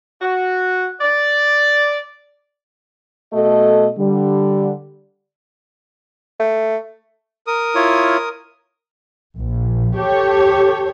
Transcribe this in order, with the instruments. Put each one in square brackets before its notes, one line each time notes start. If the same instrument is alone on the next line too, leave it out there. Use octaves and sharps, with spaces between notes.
[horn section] F#4
D5
[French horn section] B2 A3 F#4 A4 D#5
D3 G3
[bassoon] A3
[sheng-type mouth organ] A#4 D#6
[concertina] E4 F4 C#5
[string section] A#1
G4 A4 C#5